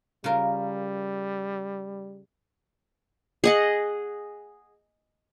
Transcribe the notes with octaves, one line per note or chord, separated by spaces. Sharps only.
C#3 G3 F4 A#4
G#4 D#5 F#5